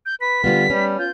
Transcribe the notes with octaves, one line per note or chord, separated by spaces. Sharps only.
G6
B4 B6
D3 G3 B3 F4
G3 C#4
F4 G6